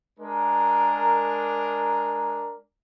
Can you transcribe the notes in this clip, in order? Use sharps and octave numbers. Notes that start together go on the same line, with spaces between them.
G#3 D4 A#4